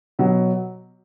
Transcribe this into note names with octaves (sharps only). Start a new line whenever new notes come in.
B2 F#3